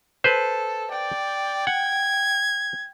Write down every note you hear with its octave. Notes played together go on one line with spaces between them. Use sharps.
A4 B4 C5
D5 G5
F#5 G#6